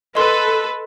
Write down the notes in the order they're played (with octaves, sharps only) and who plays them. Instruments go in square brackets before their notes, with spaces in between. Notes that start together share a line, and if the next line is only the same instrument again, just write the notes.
[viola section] A4 B4 [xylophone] D#5 C6